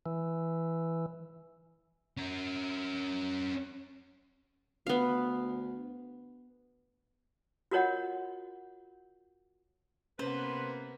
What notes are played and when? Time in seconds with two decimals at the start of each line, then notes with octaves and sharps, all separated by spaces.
0.06 E3
2.17 C#4 A#4
4.87 D2 B3 F5
7.71 F4 F#4 A#4 C#5 D#5 F#5
10.19 C3 A#3 B3 C#4 B4 C5